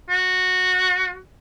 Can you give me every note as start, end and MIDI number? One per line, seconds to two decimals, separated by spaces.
0.10 1.18 66